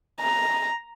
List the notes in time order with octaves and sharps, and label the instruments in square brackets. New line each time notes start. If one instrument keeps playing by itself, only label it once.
[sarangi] A#5